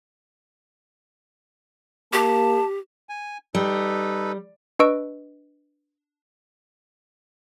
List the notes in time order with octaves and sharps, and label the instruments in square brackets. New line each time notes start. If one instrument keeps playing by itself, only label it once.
[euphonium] A#3 [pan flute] G4 [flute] A5
[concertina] G#5
[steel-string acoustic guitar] G3 [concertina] D#4 A4 B4
[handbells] D4 B4 D#5 C#6 E6 D7